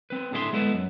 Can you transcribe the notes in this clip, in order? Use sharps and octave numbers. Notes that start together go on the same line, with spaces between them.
C4 B4
A2 D3 G#4 E5 F#5 C6
G#3 B3 E4 A4 B4 E5
F#2